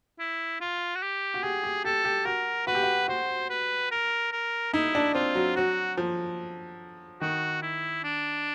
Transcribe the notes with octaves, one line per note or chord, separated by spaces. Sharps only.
E4
F4
F#4
G4
F#4
G4 G#4
G4
G4 A4
G4
F#4 A#4
F#4 B4
G4
F#4
F#4 C5
B4
A#4
A#4
D#4 E4
D4
C4 F4
F#3
F#3 F#4
F3
D#3 F#4
E4
D4